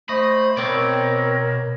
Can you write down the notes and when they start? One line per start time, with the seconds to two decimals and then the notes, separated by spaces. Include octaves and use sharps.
0.09 A3 C5 D#5 B5
0.57 B2 C4 A#4 C#5 D5